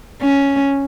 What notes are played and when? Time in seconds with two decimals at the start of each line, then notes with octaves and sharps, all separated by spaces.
0.21 C#4